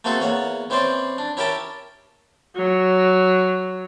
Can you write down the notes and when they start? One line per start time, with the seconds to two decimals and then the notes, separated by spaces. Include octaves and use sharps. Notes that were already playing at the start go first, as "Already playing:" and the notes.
0.04 A3 A#3 C4 F#4 G#4 A4
0.20 E2 A#3 C#5 F#5
0.70 E3 C4 C#4 C5 D5 C6
1.18 D4
1.37 C#4 E4 G4 A#4 G5 A5
2.56 F#3